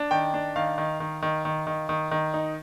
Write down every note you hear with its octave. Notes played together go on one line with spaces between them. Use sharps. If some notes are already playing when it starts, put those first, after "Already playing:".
Already playing: D4
D#3 G5
D4
D#3 F5
D#3
D#3
D#3
D#3
D#3
D#3
D#3
D#4